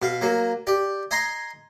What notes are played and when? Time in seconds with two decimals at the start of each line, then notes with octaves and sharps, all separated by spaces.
0.02 B2 F5
0.21 F#3 A#3
0.67 G4 D5
1.11 D#5 G#5 A#5 C6